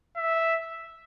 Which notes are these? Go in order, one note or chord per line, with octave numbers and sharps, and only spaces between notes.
E5